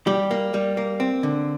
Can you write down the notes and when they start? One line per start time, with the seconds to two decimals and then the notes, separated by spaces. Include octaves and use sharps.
0.07 G3 G4
0.31 A#3
0.54 G3
0.77 A#3
1.00 C4
1.23 D3